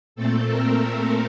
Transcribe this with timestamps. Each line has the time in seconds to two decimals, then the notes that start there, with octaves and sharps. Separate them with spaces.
0.16 A#2 A3 C4 A4
0.50 A#4
0.86 A#4